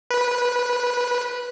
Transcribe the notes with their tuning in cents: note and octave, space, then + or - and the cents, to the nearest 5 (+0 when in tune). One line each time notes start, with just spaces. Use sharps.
B4 -15